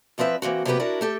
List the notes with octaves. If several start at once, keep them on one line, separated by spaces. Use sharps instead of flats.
E2 F3 C4 B4 E5
E3 A#3 C4 F#4
C3 F#3 A#3 B3 G4 B4
D4 E4 F#4 A#4
A3 G4 A4